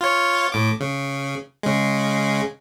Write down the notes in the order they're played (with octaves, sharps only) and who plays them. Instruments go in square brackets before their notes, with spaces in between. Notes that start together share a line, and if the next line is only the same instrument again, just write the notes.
[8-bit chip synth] F4 C#5
A2 D6
C#3
C#3 G#3